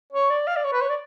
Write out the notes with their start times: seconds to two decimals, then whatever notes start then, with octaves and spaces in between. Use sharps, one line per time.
0.13 C#5
0.30 D5
0.47 F5
0.56 D5
0.64 C#5
0.73 B4
0.82 C#5
0.90 D5